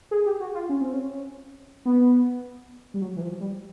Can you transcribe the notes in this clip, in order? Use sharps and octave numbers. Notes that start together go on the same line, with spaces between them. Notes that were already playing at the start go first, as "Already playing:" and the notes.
G#4
G4
F#4
F4
C#4
C4
C#4
B3
G3
F#3
E3
F3
G3